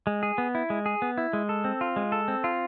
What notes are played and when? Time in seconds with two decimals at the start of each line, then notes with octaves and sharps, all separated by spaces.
0.07 G#3
0.23 G#4
0.38 B3
0.55 E4
0.70 G#3
0.86 G#4
1.02 B3
1.18 E4
1.33 G#3
1.49 A4
1.64 C4
1.81 F4
1.96 G#3
2.12 A4
2.28 C4
2.44 F4